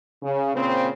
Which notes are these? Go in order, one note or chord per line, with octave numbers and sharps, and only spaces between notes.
C#3
A#2 C#3 C4